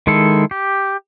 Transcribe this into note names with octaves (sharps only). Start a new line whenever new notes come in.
D#3 G#3 E4 A4
G4